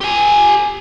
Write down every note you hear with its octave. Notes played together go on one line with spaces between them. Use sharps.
G4 G#5